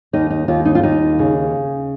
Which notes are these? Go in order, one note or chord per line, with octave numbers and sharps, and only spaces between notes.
D#2 D#4
D#4
D#2 F4
D#4
F4
D#2 D#4
C#3